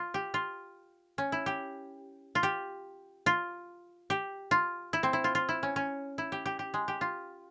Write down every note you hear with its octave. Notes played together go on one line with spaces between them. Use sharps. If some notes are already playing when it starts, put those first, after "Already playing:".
Already playing: F4
G4
F4
C#4
E4
G4
F4
G4
F4
G4
F4
E4
C4
E4
F4
F4
E4
C#4
C#4
E4
G4
G4
G4
G#3
G4
F4